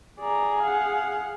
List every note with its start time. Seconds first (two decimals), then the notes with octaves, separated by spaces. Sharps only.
0.20 G#4 D5 A#5
0.63 F5 F#5